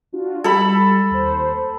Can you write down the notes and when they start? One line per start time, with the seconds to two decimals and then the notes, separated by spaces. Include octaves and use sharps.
0.12 D4 F4 F#4
0.44 G3 A4 B5
1.10 D#2 C5